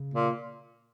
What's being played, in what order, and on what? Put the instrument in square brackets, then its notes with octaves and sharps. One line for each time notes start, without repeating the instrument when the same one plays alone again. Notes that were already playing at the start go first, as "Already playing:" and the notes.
Already playing: [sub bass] C#3
[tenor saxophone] A#2